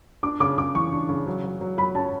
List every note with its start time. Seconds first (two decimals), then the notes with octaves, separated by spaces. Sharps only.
0.23 D4 D6
0.40 C#3 D6
0.58 C#3 D6
0.75 E3 C#6
0.92 D4
1.09 C#3
1.27 F#3
1.44 F#3
1.61 F#3
1.78 F#3 B5
1.95 C#4 A5